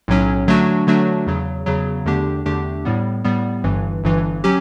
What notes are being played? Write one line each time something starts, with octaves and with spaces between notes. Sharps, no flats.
B1 A2 F#3 C#4
D3 F#3 A3 D4 F#4
D3 F#3 A3 D4 F#4
E2 C#3 F#3
E2 C#3 F#3
E2 D3 A3 D4 G4
E2 D3 A3 D4 G4
A2 G3 B3
A2 G3 B3
G1 G2 E3
G1 G2 E3
F#3 C#4 G4